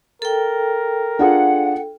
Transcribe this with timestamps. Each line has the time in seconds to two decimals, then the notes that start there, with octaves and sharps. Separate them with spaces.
0.22 A4 A#4 G5
1.19 D4 F4 G#4 F#5